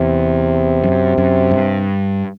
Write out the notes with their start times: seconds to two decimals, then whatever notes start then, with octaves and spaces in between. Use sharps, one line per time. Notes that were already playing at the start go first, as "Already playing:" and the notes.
Already playing: E2 C3
0.84 F#2
1.18 F#2
1.51 G2